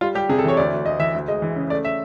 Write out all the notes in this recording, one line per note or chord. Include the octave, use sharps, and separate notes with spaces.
G3 F4
G3 G4
C3 G#4
A4
E3 C#5
D2 D5
D2
D2 D#5
E3 E5
D2
G#3 D#5
E3
C#3
A3 D5
E5